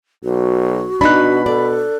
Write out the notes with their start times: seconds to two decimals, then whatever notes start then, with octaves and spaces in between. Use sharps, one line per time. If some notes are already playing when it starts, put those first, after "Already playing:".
0.25 B1 F#4
1.01 B2 D4 D#4 B5 F#6
1.46 A4 D5